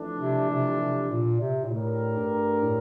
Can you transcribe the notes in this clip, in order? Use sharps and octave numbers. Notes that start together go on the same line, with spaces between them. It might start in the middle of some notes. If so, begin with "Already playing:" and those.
Already playing: F2 E3 A3 D4 A4
C3
C3
C3
A#2
C3
A#2
A2 A3 D4 G4 A#4
G2
A2